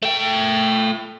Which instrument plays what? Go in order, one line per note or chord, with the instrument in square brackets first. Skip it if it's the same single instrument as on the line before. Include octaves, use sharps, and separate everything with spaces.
[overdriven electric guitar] A3 G5